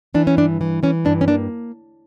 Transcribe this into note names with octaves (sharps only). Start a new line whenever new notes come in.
E3 D4
C#4
G2 D4
E3
E3 C#4
G2 D4
C#4
A#3 D4